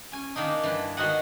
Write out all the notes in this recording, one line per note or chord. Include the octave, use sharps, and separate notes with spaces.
C#4 G#5
D#3 A#3 D4 D#4
G2 E3
D#3 G#3 D#4 F#4 D#5 F#5